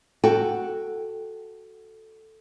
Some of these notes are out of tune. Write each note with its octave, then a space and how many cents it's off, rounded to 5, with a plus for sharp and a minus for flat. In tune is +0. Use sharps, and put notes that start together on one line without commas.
F#4 +0 A4 +0 G5 +0